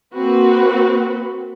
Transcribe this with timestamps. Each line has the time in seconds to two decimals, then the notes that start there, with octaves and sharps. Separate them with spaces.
0.15 A#3 C4 F#4 B4